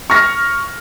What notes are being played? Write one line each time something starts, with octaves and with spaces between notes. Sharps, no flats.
C#6 F6 A#6